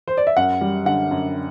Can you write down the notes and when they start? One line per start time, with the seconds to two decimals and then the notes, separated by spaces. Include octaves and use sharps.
0.08 C5
0.17 D5
0.27 E5
0.37 F#2 F#5
0.61 G3
0.86 D3 F#5
1.11 F#2